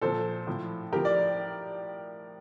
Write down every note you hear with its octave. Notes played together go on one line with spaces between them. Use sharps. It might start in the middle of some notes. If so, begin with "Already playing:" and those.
A#2 F3 A4 C5
A2 F3
A2 F3 G4 A#4
D5